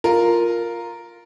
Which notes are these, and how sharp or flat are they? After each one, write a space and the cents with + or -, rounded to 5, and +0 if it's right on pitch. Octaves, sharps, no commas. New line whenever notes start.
F4 +0 A#4 +0